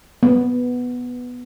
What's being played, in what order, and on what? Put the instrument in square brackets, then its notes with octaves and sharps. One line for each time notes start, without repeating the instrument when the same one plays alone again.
[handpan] B3